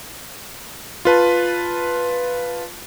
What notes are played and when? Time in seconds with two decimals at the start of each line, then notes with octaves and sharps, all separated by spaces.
1.05 F4 B4 A5